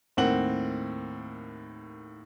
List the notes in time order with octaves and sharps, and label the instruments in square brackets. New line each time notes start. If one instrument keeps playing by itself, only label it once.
[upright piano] D#2 A2 A#3 C4 F#5 F#7